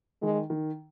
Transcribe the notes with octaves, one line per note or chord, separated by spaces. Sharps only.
D#3 G#3
D#3